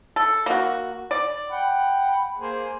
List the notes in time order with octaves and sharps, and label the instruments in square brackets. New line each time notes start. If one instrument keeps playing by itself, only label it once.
[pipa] A4
A#3 F#4
D5
[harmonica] F#5 G5 B5
A#3 G#4 C5